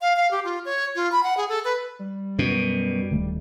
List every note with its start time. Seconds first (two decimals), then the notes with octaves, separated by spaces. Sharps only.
0.01 F5
0.16 F5
0.31 G4
0.44 F4
0.65 C#5
0.95 F4
1.12 B5
1.23 F#5
1.37 G#4
1.49 A4
1.64 B4
1.99 G3
2.39 F#2 B2
3.11 D1 D#3 A3